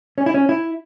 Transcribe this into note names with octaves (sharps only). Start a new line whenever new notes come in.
C#4
E4
C#4
E4